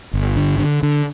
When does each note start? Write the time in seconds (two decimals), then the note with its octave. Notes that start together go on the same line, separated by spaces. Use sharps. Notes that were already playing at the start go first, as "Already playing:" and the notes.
0.14 G1
0.36 D3
0.59 D3
0.83 D3